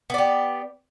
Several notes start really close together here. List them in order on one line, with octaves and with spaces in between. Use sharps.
B3 D5 G4